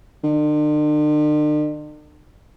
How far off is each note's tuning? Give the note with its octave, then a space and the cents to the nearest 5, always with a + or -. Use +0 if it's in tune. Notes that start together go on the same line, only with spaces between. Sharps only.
D3 +45